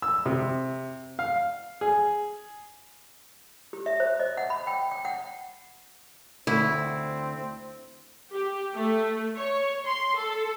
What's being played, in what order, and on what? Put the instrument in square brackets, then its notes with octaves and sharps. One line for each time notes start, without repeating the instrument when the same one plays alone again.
[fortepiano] E6
C3
F5
G#4
[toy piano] G4
E5
C5
D#5
F#5
B5
G5
G5
F#5
[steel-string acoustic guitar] D2 [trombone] C4 [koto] E4
[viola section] G4
A3
C#5
C6
A4